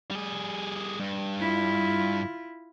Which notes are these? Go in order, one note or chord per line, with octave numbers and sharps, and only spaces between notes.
G3 G#4
G2
E4 F4